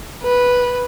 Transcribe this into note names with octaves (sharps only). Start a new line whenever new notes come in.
B4